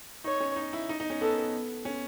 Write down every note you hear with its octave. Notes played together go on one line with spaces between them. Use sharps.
D#4 C#5
C#4
D#4
E4
D#4
D#4
C#4
B3 A4
C#4